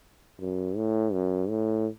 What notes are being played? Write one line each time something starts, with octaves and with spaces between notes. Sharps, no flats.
F#2
A2
F#2
A2